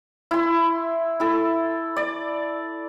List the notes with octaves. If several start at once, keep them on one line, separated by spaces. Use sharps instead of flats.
E4 C6
E4 A4
D5